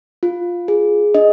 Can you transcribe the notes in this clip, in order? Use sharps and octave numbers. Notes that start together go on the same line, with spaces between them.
F4
G#4
D4 D#5